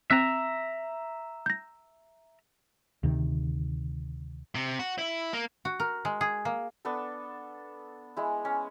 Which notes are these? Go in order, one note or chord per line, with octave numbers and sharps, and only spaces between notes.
C4 E5 A#5 F#6
G6 A#6
D2 C3 D#3
C3
F#4
E4
A#3
F#4
A#4
G#3
G#4
A#3
B3 D4 A4
G#3 E4
C#4